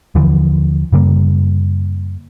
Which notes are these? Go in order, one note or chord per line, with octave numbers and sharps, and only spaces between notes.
D#2 D3 E3 F3
F#2 C#3 G3 A#3